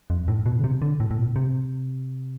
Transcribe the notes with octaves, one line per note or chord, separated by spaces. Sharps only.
F2
A2
B2
D3
C3
D3
A2
A2
B2
C3